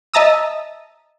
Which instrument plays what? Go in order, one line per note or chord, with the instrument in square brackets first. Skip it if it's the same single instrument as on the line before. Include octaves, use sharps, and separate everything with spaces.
[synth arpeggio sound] D#5 E5 A5 A#5 D#6 E6